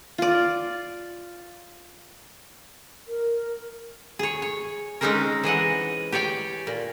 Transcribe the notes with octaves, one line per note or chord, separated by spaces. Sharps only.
F4 D5
A#4
G#4 C#5
C#5
G#3 C4 C#4 D#4 G#4 A#4
E3 G#4 D#5 F#5
G4 C#5 D5 G5 G#5
A#2